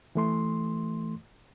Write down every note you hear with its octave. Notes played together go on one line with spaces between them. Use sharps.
E3 A3 C6